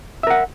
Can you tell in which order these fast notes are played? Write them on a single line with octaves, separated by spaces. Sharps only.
E5 A#4 F#5